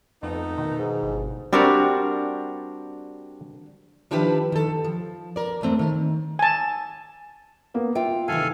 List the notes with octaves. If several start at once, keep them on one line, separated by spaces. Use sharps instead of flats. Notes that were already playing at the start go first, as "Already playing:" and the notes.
F2 A3 B3 D#4
B2 D#3
G#2
G1
G3 C4 D4 F#4 G4 A#4
D#3 F3 D4 E4 G4 B4
D#3 A4
F3
A#4 D5
E2 G#2 A3 C4
D#3
G#5 A5
A#3 B3
F4 E5 G5
C3 D#3 E3 A4 F5 G#5